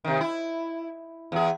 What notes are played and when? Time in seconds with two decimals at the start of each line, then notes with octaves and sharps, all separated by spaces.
0.04 C3 D#3
0.21 E4
1.32 E2 G#4